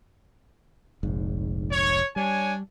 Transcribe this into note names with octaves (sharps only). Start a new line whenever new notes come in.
F1 A#1 G#2
C#5
G3 D4 C#5 G#5